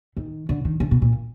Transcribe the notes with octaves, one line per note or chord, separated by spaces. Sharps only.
D#3
D3
D#3
D3
B2
A#2